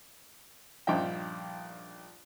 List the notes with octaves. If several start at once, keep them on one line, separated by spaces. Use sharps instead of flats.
A#1 G2 F3 D#4 E5 G5